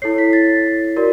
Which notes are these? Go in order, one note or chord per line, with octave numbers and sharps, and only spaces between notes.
E4 A4 C#5 C7
B6
A6
F#4 A#4 D5